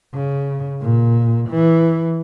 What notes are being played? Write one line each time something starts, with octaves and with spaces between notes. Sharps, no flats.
C#3
A#2
E3